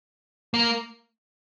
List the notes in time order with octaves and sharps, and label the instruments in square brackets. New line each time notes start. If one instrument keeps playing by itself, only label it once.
[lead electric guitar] A#3